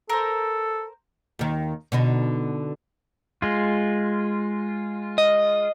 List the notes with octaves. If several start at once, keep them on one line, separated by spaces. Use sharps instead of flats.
A4 A#4 C5
D#2 D#3
B2 D3 D#4
G#3 F4
D#5